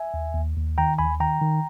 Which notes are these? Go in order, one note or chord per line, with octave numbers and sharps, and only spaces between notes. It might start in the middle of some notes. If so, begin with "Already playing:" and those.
Already playing: E5 G#5
D#2
D#2
D#2
D#3 G5 A#5
D#2 G#5 B5
D#3 G5 A#5
D#3